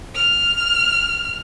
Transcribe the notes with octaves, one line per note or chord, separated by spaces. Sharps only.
F6